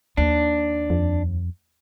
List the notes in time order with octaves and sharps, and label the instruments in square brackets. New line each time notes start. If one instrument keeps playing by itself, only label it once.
[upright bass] D#2 [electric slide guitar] D4
[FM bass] F2